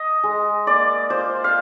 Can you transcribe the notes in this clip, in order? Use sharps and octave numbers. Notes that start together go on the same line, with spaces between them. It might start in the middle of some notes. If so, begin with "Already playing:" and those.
Already playing: D#5
G#3
A#3 D5
F4 C5
F5